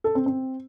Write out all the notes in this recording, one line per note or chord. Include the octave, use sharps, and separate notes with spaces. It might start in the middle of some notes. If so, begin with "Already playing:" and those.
A4
C4
C4